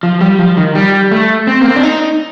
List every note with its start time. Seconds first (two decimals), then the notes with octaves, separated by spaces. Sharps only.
0.03 F3
0.21 G3
0.39 F3
0.57 D#3
0.75 G3
1.11 A3
1.47 C4
1.61 A#3
1.69 C4
1.76 D4
1.83 D#4